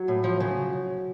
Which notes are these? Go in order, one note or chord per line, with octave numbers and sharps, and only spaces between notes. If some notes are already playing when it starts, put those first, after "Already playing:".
Already playing: F#3
A2
F3
C#3